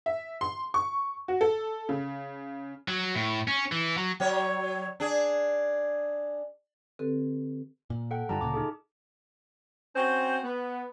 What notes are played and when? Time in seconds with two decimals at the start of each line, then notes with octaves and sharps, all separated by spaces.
0.06 E5
0.41 C6
0.74 C#6
1.28 F#4
1.41 A4
1.89 C#3
2.88 F#3
3.15 A2
3.48 C#4
3.72 E3
3.97 F#3
4.20 F#3 C#5
5.00 D4 G#4
6.99 D3 C4 G4 A4 B4
7.90 A#2
8.11 A4 F#5 G5
8.29 G2 D3 G3 F4 A5 A#5
8.41 D2 A#2 C#3 D6
8.54 D#4 G#4 A4
9.96 C4 C#4 F#4 C5
10.44 B3